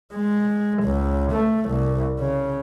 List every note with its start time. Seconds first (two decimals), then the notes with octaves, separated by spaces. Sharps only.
0.14 G#3
0.83 C#2
1.32 A3
1.70 C2
2.19 C#3